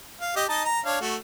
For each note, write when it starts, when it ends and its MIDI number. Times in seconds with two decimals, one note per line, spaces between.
0.21 0.33 77
0.36 0.44 67
0.36 0.44 75
0.49 0.64 63
0.49 0.64 75
0.49 0.64 81
0.65 0.80 82
0.85 0.99 62
0.85 0.99 73
0.85 0.99 77
1.01 1.16 57
1.01 1.16 66